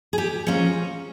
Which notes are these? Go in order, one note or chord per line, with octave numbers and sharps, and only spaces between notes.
G#4
G4
F3 A#3 C#4 G#4